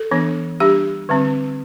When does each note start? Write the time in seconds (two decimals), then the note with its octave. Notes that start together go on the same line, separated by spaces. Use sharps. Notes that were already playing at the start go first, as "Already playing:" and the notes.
Already playing: A4
0.11 E3 B3 D4
0.60 G3 D4 G4
1.09 D3 G3 C4